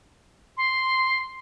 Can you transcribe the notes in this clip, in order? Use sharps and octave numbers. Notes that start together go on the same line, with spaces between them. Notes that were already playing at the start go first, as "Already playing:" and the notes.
C6